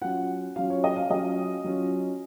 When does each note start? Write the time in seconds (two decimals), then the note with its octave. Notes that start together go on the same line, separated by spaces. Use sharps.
0.01 F#3 C#4 F4 F#5
0.56 F#3 C#4 F4 F5
0.70 C#5
0.84 D#5
0.96 F5
1.10 F#3 C#4 F4 D#5
1.64 F#3 C#4 F4